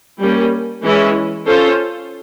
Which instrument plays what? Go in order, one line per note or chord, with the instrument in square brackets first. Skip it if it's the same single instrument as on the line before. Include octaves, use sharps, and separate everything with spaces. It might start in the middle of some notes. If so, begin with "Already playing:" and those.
[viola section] G3 A#3 C#4
E3 G#3 C#4 E4
C#4 F4 A4 C5